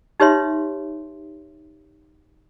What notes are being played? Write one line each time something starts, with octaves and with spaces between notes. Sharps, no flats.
D#4 G4 B4 C#5 E5 C6